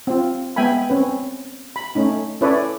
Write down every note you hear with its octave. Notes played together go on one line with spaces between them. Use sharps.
C4 F4
G#3 B3 E5 G5 G#5 B5
C4 C#4 B4
B5
A3 C#4 D#4
C#4 E4 A4 B4 C#5 D5